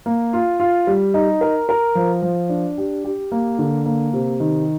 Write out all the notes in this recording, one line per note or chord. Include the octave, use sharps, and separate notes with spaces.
A#3
F4
F4
G3
D#4
A#4
A#4
F3
F3
D4
G4
G4
A#3
D3
A#3
C3
D#3